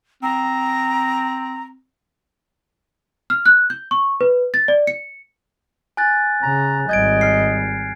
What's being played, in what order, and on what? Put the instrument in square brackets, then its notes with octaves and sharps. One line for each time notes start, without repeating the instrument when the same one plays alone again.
[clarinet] C4 [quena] A#5
[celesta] F6
F#6
G6
C#6
B4
A6
D5
C#7
[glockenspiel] G#5 F#6 A6
[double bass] C#3 [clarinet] A#5
[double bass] G#1 G3 [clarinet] D#5 [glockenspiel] G6 G#6 D7
[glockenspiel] F6 C7